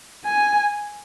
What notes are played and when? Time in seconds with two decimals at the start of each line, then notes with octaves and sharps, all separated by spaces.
0.25 G#5